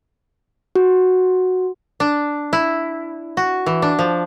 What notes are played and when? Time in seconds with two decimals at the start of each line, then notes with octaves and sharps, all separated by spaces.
0.76 F#4
2.00 D4
2.53 E4
3.37 F#4
3.66 E3
3.82 D4
3.99 F3